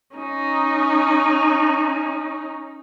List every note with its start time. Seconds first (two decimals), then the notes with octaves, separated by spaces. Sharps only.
0.16 C#4 D#4